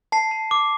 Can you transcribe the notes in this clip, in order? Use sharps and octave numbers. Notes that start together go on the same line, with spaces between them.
A5 C7
A5
D6